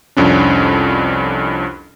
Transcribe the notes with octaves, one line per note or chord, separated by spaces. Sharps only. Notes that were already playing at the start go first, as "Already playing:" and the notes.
C2 F2 C#4 D4